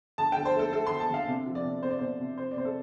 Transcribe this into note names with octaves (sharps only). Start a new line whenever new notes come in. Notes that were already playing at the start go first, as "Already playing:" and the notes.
D3 A5
D3 G5
C5
A3 A4
A3 A4
D3 C6
A5
D3 F5
C3
F3
D5
C3
C3 C5
D5
C3 C5
C3
C3 C5
D5
C3 C5
A4